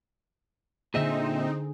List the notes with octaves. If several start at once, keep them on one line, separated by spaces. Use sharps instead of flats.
A#2 D3 C4 D#4 G#4 D#5 E5